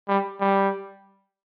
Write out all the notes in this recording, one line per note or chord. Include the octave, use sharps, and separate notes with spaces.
G3
G3